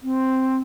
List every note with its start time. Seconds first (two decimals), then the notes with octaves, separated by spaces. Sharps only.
0.01 C4